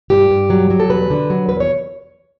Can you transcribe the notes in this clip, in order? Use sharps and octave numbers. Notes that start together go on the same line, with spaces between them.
G2 G4
G2
F#3
F#3
A4
E2 B4
D3
F#3
E2 B4
C#5